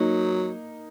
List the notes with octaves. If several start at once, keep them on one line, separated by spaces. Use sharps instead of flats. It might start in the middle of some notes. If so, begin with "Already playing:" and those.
Already playing: F#3 A#3 D#4